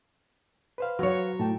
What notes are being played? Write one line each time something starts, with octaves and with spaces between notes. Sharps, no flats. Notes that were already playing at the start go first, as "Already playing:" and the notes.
B4 C5 F5
F#3 F#4 C#5
A2 G5 A5